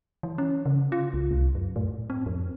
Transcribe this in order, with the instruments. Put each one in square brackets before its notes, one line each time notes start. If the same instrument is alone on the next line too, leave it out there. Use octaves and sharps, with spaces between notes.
[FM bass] E3
C#4
C#3
F4
C#2
C2
F#2
A2
C4
F2